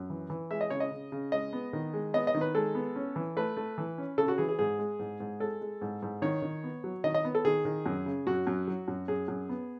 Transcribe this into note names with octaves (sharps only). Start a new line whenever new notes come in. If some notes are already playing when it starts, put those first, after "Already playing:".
Already playing: F#2
E3
E3
G#3 E5
D#5
C#3 C#5
D#5
C#3
C#3
G#3 D#5
B3
D#3
G#3
B3 D#5
D#5
D#3
B4
G#3 A4
B3
C#4
E3
A3 B4
A3
E3
C#4
C#3 A4
F#4
E3 G#4
G#4
G#2 G#4
G#3
G#2
G#2
G#3 A4
G#3
G#2
G#2
D#3 C#5
D#3
B3
F#3
D#3 D#5
D#5
B3
A4
D#3 G#4
D#3
F#2
C#3
F#2 F#4
F#2
F#3
F#2
F#2 G#4
F#2
B3